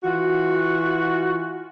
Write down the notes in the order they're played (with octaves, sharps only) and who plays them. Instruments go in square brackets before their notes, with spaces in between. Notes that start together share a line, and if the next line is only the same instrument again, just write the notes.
[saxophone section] E3 F4 F#4